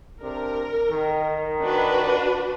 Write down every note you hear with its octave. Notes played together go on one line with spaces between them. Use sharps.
C3 D4 A#4
D#3
D4 F#4 B4